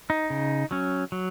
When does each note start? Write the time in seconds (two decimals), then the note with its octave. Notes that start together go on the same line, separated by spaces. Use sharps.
0.10 D#4
0.30 C#3
0.71 F#3 C#4
1.12 F#3